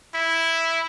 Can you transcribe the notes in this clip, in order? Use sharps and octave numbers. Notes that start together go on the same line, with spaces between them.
E4